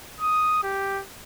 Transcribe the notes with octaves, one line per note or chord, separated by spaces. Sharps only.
D#6
G4